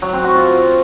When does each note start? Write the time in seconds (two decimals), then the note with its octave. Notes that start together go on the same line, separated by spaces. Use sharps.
0.02 F#3
0.13 C4
0.24 F#4
0.35 F4